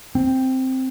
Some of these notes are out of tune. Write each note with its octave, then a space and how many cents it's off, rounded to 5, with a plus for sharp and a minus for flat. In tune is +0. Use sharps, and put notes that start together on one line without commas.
C4 +0